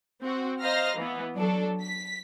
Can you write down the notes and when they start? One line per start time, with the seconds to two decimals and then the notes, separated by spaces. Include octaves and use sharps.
0.21 C4 F#4
0.62 C5 D#5 F5 A#5 F6 A#6
0.96 E3 B3
1.36 F#3 D4 A4
1.81 B6